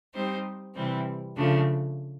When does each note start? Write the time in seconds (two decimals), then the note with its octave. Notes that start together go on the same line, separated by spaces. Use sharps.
0.14 G3 C4 D#4 G4 C5
0.75 C3 E3 G3 C4
1.36 C#3 F3 A3 D4